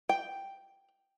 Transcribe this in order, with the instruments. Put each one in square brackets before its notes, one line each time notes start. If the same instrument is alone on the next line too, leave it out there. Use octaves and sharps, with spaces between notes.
[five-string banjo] G5